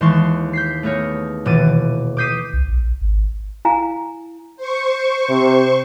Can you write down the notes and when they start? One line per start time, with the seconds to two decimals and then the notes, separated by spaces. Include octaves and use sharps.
0.01 D#2 E3 G#3 A5 C6 C#6
0.53 G6 B6 C7
0.83 A3 B3 G#4 A#4 C#5
1.45 D#1 B2 E3 D6 A6 D#7
2.17 D6 D#6 G6 B6 C7 D#7
2.53 C2
2.68 A#1
3.01 G#1
3.65 E4 F5 G#5 A#5
4.57 C5 C#6
5.30 C3